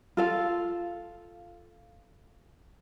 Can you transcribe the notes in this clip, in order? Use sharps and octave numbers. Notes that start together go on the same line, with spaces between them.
F4 A4 F5